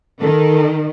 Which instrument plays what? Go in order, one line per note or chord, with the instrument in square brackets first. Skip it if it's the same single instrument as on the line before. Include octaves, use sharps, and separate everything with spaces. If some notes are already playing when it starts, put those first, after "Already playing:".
[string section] D#3 [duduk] A4